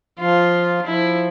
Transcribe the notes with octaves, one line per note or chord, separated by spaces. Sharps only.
F3 F4
F3 E4